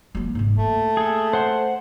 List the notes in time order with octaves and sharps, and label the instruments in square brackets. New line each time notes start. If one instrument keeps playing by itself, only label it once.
[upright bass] F#3 A#3
G#2 B2
[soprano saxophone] A3 [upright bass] A#3
[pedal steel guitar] G#4 A4
C5 F#5 C6